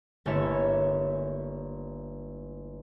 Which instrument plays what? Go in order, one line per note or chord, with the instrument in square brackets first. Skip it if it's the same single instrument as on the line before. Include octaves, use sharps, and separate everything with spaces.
[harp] G1 A3 A#3 E4 C#5 E7